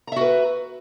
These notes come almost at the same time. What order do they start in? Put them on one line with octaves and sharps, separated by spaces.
A#5 E5 F#4 B4